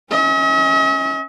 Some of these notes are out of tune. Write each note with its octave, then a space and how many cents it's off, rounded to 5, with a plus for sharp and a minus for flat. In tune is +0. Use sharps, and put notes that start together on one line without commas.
C#4 -10 D#5 +45